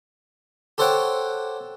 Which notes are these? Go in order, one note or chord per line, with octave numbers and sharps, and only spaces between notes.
G4 A4 C5 C#5 F#5 G5